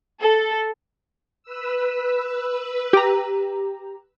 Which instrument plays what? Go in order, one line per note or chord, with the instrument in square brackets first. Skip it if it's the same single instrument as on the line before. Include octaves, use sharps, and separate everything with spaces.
[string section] A4
[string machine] B4 E6
[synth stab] G4 A#5